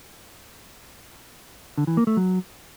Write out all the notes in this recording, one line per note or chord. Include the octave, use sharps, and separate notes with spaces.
D3
E3
A#3
A3
F#3